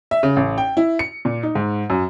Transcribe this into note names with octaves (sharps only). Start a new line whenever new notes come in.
E5
C#3
A1
G5
E4
C#7
A#2
D#4
G#2
F#2